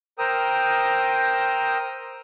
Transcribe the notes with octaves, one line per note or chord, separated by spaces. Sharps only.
A#4 C5 G5 A#5 D#6 E6